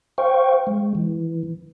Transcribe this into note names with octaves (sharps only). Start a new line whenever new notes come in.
C5 F5 G5 C#6
G#3
E3